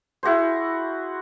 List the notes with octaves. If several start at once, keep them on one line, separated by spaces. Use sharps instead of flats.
E4 F#4 G#4 C5